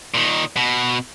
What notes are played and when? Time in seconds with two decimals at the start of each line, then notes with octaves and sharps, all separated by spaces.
0.14 A#2 D#3
0.56 B2